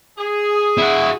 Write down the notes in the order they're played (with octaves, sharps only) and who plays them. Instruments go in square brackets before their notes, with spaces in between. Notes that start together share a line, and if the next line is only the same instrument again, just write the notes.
[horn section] G#4
[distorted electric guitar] E4 F#4